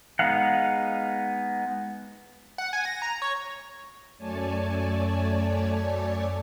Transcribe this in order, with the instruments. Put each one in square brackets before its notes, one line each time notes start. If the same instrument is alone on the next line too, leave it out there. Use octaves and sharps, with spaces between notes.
[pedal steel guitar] G#3 B3 D#4 F5 F#5
[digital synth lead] F#5
G#5
A#6
A#5
C#5
[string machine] F#2 A3 C#5 D5 G#5 A5